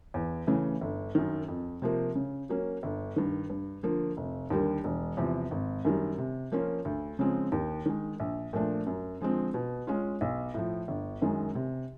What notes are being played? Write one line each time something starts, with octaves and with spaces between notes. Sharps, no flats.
E2
C#3 E3 A3
G1
F#2 D#3
F2
C3 F3 A#3
C#3
F#3 A#3 C#4
G1
G2 D#3
G2
D3 F3 A#3
F1
D#2 D3 G3 A#3
E1
E2 C3 F3
G#1
F#2 D#3 G3
C3
F3 A#3 C#4 F4
D2
C#3 F3 G#3 C4
D#2
D#3 G#3
A#1
A#2 F3 A3 D4
F#2
D3 F3 G#3 C4
B2
G#3 C#4 F4
B1
A2 F3
G1
F#2 D#3 G#3
C3